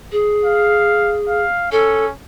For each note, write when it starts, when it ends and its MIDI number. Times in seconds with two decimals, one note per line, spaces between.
0.12 1.42 68
0.44 1.17 77
1.28 1.70 77
1.72 2.11 61
1.72 2.05 69